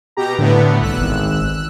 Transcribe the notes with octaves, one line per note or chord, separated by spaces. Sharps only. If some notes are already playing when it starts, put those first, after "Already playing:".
B2 G4 A#5
A2 D3 A3 B3
C2 E6 F#6
G#1